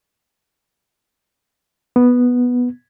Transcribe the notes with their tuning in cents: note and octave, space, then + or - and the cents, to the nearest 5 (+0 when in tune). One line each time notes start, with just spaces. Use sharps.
B3 -5